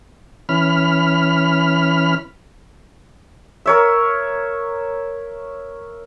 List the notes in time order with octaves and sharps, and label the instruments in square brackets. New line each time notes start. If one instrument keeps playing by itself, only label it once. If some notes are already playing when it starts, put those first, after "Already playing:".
[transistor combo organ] E3 C#4 B5 F6
[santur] A#4 C#5 E5